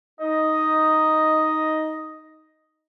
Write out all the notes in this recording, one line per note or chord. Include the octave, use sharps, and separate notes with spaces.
D#4 D#5